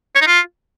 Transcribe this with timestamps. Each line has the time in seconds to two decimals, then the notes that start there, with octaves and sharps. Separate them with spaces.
0.15 C#5
0.21 D#4
0.27 F4